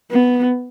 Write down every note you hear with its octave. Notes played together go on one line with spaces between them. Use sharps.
B3